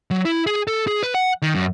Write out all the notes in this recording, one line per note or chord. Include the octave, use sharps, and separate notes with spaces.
F#3
E4
G#4
A4
G#4
B4
F#5
D#3
F#2